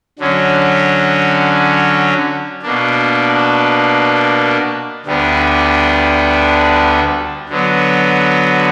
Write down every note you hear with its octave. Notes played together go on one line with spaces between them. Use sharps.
D3 F#3 C#4
B2 A#3 D4
D2 D3 G3 B3 D4
D3 F#3 B3